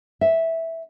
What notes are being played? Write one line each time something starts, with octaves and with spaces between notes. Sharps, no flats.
E5